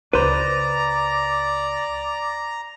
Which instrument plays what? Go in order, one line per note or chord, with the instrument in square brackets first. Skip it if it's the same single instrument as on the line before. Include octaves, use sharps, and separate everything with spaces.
[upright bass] C#2 [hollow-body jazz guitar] B4 C5 [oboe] D5 [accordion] A#5